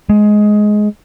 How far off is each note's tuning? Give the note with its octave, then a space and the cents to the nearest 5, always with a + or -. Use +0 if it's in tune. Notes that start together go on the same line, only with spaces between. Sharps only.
G#3 +15